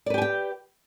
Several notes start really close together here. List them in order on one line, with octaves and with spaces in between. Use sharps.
D5 B4 G4 G#5 G5